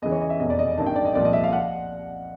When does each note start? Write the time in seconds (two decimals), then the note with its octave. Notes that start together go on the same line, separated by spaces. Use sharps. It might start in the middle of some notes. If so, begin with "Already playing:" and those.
0.02 E2 C#3 E3 D#5
0.12 C#5
0.22 D#5
0.30 E5
0.40 F1 E2 B2 D#5
0.50 D5
0.59 D#5
0.78 A1 G2 D#3 A5
0.86 G5
0.96 D5
1.05 D#5
1.15 C2 A#2 F3 D5
1.25 D#5
1.33 E5
1.44 F5
1.53 F#5